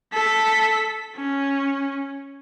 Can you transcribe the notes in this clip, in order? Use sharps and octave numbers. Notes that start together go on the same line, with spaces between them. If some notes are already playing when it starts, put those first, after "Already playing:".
A4 B6
C#4